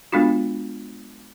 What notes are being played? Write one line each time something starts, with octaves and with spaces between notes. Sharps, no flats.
G#3 B3 D4 F4 F#4